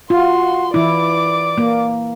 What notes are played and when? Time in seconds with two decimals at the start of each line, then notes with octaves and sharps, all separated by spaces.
0.10 F4 F#4 C6
0.74 E3 E4 D5 D6
1.58 A#3